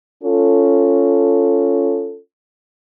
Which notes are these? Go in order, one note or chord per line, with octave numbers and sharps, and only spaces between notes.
C#4 F4 A4